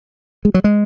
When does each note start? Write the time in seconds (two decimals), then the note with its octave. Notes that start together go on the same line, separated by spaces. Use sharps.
0.45 G#3
0.54 F#3
0.64 G#3